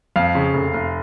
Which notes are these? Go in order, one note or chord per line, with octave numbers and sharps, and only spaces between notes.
F2 F5
C#3
F1
F1